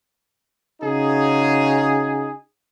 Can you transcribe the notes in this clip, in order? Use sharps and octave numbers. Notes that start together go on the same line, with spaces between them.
C#3 D#4 F#4 G#4